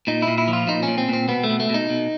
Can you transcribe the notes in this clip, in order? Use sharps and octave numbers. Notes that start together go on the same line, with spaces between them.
A#2 D#4
E4
A#2
E4
F3
F4
A#2 D#4
A#2 C#4
C4
A#2 C4
B2 B3
A3
B2
A3
B2 D#4
B2